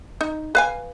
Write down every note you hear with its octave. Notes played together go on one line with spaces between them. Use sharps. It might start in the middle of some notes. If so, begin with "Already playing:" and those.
D#4
B4 F5 G#5